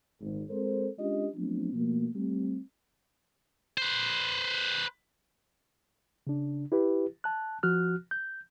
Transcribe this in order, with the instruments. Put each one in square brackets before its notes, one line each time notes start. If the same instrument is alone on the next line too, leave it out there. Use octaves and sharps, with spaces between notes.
[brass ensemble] G#1
G#3 C4 A4 A#4 C5
G#3 C#4 D4 F4 G4 D#5
F3 F#3 A3 B3 C4 D4
B2 F3 A3 A#3
G3 A3 C4
[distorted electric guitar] B4 C5
[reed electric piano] C#3 D4
E4 G4 B4
A5 F#6
F3 F#4 F6 F#6
G6